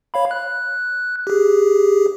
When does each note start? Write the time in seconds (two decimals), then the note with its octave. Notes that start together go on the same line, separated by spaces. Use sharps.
0.14 C#5 F5 B5
0.31 F#6
1.27 G4 G#4